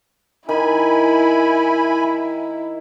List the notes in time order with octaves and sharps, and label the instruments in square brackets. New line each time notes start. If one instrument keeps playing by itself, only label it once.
[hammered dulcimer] D#3 [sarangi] E4 [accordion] G#5 B5